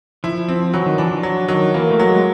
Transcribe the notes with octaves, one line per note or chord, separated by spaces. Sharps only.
F3 E4
C4
E3 F#3
D#3
E3 D4
F3
F#3
D#3 F#3
E3 A#3
A3
F#3
G#3